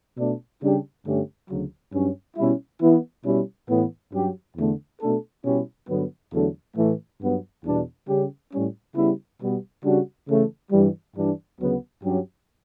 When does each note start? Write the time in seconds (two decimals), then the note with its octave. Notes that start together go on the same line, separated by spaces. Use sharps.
0.17 B2 A3 D4
0.61 C#3 G3 D4 G4
1.05 G2 D3 A3 C#4 G4
1.49 D2 C#3 F#3
1.93 G2 F#3 C#4
2.37 B2 G3 C#4 E4
2.81 E3 B3 E4
3.25 B2 G3 C#4 E4 G4
3.68 A2 E3 B3
4.13 G2 F#3 C#4 G4
4.57 E2 D3 A3
5.01 B2 A3 D4 A4
5.44 B2 G3 C#4 E4 G4
5.88 G2 D3 F#3 B3
6.33 E2 D3 F#3 A3 D4
6.76 A2 E3 A3
7.21 G2 F#3 B3
7.65 E2 B2 G3 D4
8.08 C#3 G3 C#4 G4
8.52 A2 G3 C#4
8.96 C#3 G3 B3 E4
9.40 B2 G3 B3
9.84 C#3 G3 D4 F#4
10.28 C#3 E3 A3
10.72 G2 E3 G3
11.15 G2 E3 G3 D4
11.60 D2 C#3 F#3 B3
12.04 G2 F#3 C#4 G4